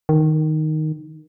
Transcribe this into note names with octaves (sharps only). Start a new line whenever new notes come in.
D#3